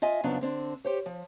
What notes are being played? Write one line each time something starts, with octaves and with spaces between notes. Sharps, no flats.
F4 D#5 E5 G#5
F2 C#3 F3 F#3 B3 D4
D3 C4 D4
G4 C5 C#5
F3